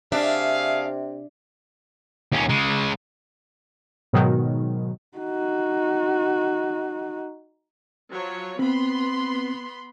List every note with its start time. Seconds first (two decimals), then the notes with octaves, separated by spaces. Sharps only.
0.12 C3 A3 D4 G#4 E5 F5
2.32 D#2 C#4
2.49 C#3 G#3
4.13 G#2 B2 D#3 F#3
5.18 D#4 F#4
8.11 F3 F#3 C#5
8.59 B3 C4 B5 C6